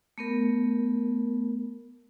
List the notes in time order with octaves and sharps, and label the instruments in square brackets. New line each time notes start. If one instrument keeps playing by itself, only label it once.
[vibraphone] A3 B3 A#4